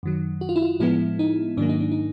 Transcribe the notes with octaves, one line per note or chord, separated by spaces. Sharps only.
F#2 D#3 F#3
F#4
F4
E4
F4
A2 F3 G#3 B3 E4
D#4
G#2 D#3 F#3 A#3 D4
D#4
D4
D#4